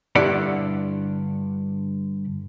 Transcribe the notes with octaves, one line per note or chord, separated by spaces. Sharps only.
G2 D3 E4 D5 F#5 B5